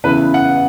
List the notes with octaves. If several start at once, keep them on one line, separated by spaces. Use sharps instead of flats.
E2 C#3 E3 B4
F#5